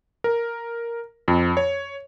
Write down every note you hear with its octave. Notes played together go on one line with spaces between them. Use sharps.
A#4
F2
C#5